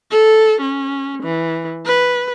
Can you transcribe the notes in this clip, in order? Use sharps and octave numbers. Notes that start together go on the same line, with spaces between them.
A4
C#4
E3
B4